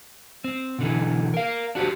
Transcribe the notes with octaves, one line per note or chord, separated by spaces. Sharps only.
C4
B2 D3 E3
A#4 F5
D4 F#4 G4 C5